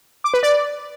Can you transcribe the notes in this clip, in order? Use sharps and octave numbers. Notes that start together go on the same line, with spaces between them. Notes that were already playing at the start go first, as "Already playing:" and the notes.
D6
B4
D5